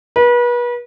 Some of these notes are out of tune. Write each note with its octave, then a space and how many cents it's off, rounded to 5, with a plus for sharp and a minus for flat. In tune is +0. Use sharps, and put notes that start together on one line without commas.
B4 -35